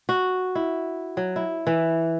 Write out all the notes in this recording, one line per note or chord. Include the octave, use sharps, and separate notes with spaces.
F#4
E4
F#3
E4
E3